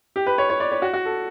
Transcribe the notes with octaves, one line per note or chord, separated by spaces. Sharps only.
G4
B4
C#5
C#5
D5
C#5
F#4
F#4
A4